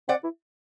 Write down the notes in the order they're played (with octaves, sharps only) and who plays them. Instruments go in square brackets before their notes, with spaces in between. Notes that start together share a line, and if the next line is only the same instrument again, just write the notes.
[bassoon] C4 [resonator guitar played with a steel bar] D5 F#5
[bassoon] E4